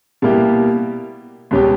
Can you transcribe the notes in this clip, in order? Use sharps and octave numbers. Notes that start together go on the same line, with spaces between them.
B2 G3 A#3 E4 G4
C#2 B2 G3 C#4 G4